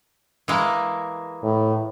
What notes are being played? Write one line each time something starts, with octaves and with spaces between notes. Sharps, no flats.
E3 G#3 A#3
A2